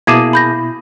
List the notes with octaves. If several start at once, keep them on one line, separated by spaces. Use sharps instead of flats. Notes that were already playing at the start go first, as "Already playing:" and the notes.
B2 A#3 E4 G#4 A5 D6 D#6 G#6
B5 G6 A#6